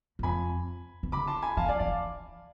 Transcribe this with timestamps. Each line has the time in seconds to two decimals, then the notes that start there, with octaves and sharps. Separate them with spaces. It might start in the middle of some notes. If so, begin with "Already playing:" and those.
0.19 G#2
0.23 F2 G#5 B5
1.03 E3
1.12 D3 B5 D6
1.27 A5 C6
1.42 G#5 B5
1.57 E3 F5 A5
1.65 G#5
1.69 F3 D5 F5
1.79 E3 D5 F5